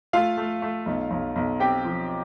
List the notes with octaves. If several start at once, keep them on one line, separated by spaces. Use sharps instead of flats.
A3 F4 F5
A3
A3
B1
B1
B1
C4 G4 G5
F3